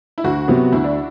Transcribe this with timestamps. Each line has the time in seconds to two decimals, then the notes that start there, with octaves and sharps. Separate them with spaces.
0.18 E4
0.24 D2 F#4
0.48 C3 F#3 B3
0.72 D2 E4
0.84 D4